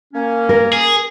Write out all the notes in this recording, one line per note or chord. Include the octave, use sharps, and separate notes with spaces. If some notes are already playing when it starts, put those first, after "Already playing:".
A#3 C#4
A#4
G#4